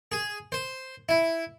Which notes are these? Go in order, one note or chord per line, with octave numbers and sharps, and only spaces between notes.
G#4
C5
E4